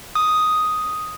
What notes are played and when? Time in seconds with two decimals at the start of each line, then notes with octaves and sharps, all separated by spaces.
0.15 D#6